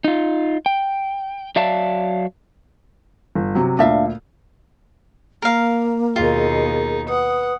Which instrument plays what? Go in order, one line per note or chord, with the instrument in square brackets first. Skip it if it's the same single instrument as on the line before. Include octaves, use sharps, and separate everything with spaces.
[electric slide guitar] D#4 F4
G5
F#3 D5 E5 F5 A5
[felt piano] G1
C3 F#3
[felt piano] D2 A#2 [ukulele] D4 E5 F5
[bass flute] A#3 [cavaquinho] A#4 F5
[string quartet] D#2 B2 D#4 [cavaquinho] F4 [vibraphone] G#4 A#4
[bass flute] B4 [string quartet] F#5 [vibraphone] D#6